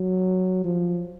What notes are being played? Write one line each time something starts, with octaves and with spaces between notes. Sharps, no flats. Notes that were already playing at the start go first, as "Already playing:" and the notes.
Already playing: F#3
F3